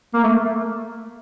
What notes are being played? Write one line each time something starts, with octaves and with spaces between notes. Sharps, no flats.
A#3
A3